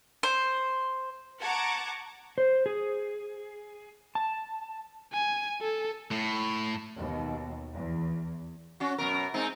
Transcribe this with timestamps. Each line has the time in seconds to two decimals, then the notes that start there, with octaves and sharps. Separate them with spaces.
0.23 C5
1.40 F#5 A5 A#5 C#6 D6 G#6
2.38 C5
2.66 G#4
4.15 A5
5.13 G#5
5.62 A4
6.11 A2
6.98 D#2 B2
7.74 E2
8.80 C#4 F#4
8.98 F#2 B2 A#4
9.34 G#3 C4 D#4